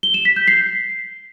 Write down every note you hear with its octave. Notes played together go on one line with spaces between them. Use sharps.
G7
E7
B6
G6
C7